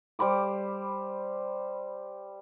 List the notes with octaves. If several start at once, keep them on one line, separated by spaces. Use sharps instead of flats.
G3 C5 B5 D6